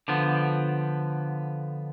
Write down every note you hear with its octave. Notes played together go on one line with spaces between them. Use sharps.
D3 F3 B3